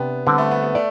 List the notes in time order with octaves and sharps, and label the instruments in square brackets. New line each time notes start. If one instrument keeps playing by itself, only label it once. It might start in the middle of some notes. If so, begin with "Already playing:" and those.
Already playing: [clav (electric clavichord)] C3 D4 [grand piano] B3
[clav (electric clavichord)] D3 G3 C4 [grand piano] B3
[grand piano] A3
B3
B3
[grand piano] A3 [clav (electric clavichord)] D5